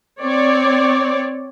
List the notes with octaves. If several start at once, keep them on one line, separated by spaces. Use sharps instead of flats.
C4 C#5 D5